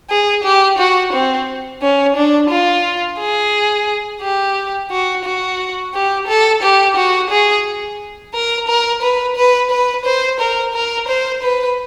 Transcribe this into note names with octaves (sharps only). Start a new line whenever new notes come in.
G#4
G4
F#4
C4
C#4
D4
F4
G#4
G4
F#4
F#4
G4
A4
G4
F#4
G#4
A#4
A#4
B4
B4
B4
C5
A#4
A#4
C5
B4